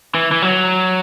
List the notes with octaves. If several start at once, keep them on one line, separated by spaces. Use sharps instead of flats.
E3
E3
F#3